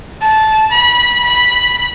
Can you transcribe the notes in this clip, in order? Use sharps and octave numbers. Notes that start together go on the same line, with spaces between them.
A5
B5
B5